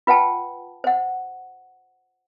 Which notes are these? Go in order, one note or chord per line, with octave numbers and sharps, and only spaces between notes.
F4 B4 F#5 G5 A5
C5 F#5